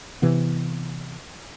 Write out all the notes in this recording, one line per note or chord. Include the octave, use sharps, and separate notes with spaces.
C3 E3 B3